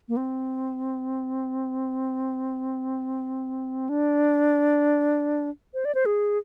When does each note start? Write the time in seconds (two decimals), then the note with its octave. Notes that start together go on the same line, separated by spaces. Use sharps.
0.08 A#3
0.17 C4
3.89 D4
5.74 C5
5.85 D5
5.95 C5
6.06 G#4